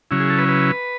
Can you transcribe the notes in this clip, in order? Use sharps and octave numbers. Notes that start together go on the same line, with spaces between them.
C#3 F#3 C#4 E4
G#4
A4
B4
B4